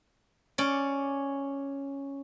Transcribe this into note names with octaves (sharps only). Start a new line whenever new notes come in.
C#4 D5